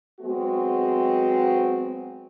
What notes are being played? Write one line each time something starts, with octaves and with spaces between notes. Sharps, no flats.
F#3 G#3 B3 C4 F#4